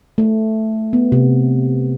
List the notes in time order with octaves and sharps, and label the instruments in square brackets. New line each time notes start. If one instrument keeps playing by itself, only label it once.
[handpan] A3
B3
C3